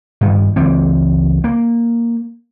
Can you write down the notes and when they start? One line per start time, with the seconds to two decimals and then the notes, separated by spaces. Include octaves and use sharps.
0.21 G2 D#3
0.56 C#2 E3 C4
1.44 A#3